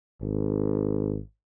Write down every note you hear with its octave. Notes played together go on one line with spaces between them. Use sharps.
G#1